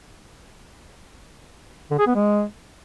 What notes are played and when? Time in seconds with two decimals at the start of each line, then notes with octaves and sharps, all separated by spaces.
1.91 D3
1.99 G#4
2.07 B3
2.15 G#3